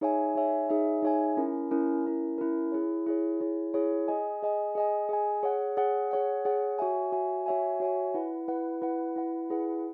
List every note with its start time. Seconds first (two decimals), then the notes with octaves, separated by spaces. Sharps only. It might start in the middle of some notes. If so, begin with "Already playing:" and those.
0.01 D#4 G#4 C#5 E5 G#5
0.35 D#4 G#4 C#5 E5 G#5
0.69 D#4 G#4 C#5 E5 G#5
1.02 D#4 G#4 C#5 E5 G#5
1.37 C#4 E4 A#4
1.71 C#4 E4 A#4
2.05 C#4 E4 A#4
2.38 C#4 E4 A#4
2.72 E4 G#4 C#5
3.07 E4 G#4 C#5
3.41 E4 G#4 C#5
3.74 E4 G#4 C#5
4.08 G#4 D#5 G#5
4.42 G#4 D#5 G#5
4.75 G#4 D#5 G#5
5.09 G#4 D#5 G#5
5.43 G#4 C#5 F#5
5.77 G#4 C#5 F#5
6.11 G#4 C#5 F#5
6.45 G#4 C#5 F#5
6.79 F#4 C#5 E5 G#5
7.12 F#4 C#5 E5 G#5
7.46 F#4 C#5 E5 G#5
7.80 F#4 C#5 E5 G#5
8.14 E4 B4 F#5
8.48 E4 B4 F#5
8.82 E4 B4 F#5
9.16 E4 B4 F#5
9.50 E4 G#4 B4 F#5